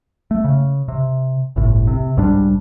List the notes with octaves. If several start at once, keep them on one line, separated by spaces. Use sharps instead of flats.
A3
C#3
C3
G1 C2 A2
C3
C2 G#2 G3 D4